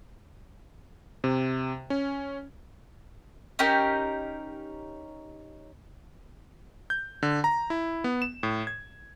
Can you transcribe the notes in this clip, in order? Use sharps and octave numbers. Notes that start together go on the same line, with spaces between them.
C3
C#4
C#4 D#4 G4 A#4
G6
D3
A#5
E4
B3
E7
A2
G#6